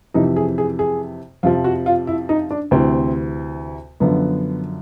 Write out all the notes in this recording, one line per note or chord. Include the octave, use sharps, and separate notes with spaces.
F2 C3 E3 D#4
G#4
G#4
G#4
F2 C3 F3 F4
F#4
F4
E4
D#4
D4
D2 C3 E3 C4
F#2 D3 F3 B3